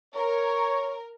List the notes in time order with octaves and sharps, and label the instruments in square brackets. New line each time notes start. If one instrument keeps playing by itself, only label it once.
[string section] A#4 [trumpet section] C#5